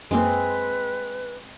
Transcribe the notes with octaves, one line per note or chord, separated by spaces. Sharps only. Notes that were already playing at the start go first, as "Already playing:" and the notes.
F#2 G#3 A#3 C4 B4